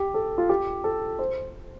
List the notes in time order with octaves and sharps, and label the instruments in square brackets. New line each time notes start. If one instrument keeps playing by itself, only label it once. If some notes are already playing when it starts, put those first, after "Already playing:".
Already playing: [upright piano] G4
A4
F4
G4
A4
C5